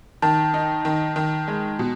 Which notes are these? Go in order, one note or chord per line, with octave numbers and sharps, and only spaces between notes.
D#3 A5
D#4
D#3
D#3
G#3
B2